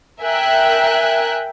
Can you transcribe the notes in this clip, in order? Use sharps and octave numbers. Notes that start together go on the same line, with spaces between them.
A#4 E5 G5 G#5 F#6